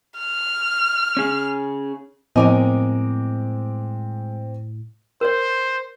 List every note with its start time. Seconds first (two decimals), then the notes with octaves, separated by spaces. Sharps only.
0.18 F6
1.17 C#4 G#4
2.36 A2 F3 G#3 B3 C4 A#4 D#5 D6
5.21 A#4 C5 C#5